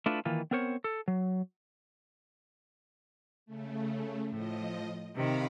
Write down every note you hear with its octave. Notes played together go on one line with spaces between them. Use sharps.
A3 D4 E4 F4 B4
D#3 E3 A#3 F4
B3 C4 A#4 C5 C#5
A4
F#3
C#3 A3
A2 F3 D#5
C3 D#3 F5 A#5 B5